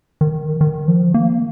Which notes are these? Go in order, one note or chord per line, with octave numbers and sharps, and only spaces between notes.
D#3
D#3
F3
A#3